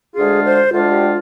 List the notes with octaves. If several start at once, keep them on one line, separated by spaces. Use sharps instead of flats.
D2 D3 G#3 D4 F4 G#4
C5
D2 D3 G#3 D4 F4
G4